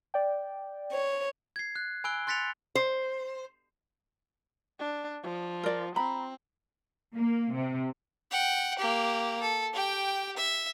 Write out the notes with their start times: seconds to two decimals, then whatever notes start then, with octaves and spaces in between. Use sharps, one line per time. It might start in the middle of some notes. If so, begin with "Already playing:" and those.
0.14 D5 G5
0.92 C#5
1.56 G#6 C7
1.76 F#6
2.04 G#5 B5 E6 F#6 D7 G7
2.27 C6 F#6 A6 B6 C#7 F7
2.75 C5
4.79 D4
5.23 F3
5.63 A#4 D5
5.96 C4 A#5 B5
7.16 A#3
7.55 C3
8.31 F#5 G5
8.79 A#3 G4
9.41 A4
9.74 G4 G5
10.36 E5